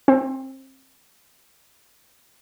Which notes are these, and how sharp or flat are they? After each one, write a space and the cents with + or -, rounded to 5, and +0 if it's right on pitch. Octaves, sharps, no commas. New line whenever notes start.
C4 +25